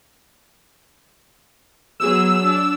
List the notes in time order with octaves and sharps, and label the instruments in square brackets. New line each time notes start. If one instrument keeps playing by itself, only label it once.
[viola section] F#3 B3 G#4 [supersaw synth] E6
[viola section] D4